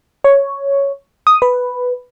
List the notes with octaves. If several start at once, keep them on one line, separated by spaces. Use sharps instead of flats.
C#5
D#6
B4